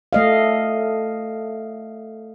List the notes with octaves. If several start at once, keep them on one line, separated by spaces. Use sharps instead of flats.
A3 D#5 F5